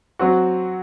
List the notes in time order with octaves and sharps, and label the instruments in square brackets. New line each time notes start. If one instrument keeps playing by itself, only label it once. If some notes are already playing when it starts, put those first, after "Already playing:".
[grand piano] F#3 C4 F#4